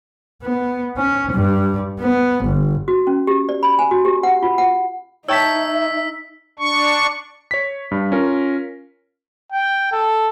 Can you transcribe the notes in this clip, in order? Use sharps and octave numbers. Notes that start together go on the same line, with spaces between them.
B3
C#4
G2
B3
G1
F#4
C#4
G4
D5
B5
G#5
F#4
G4
F#5
F4
F#5
D#4 C#5 E5 G5 A5 E6 B6
D4 C#6
C#5 B6
G2
C#4 F4 A#4
G5
A4